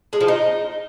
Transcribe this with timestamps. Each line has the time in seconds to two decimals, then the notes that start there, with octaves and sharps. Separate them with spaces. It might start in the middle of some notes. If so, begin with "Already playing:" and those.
0.13 G#3
0.21 F3
0.28 D#4